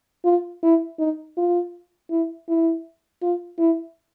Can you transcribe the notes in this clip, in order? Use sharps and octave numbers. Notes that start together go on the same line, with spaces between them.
F4
E4
D#4
F4
E4
E4
F4
E4